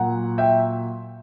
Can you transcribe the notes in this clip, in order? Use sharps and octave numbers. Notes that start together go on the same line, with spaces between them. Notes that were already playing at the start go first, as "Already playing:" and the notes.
Already playing: A#2 F#3 F#5 A#5
E5 G5